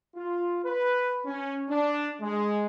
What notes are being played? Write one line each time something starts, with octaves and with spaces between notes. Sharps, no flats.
F4
B4
C#4
D4
G#3